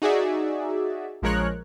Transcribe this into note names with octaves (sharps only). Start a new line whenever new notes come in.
D#4 F#4 G#4 D5 E5
A#1 F3 G#3 A#4 C#5 F#6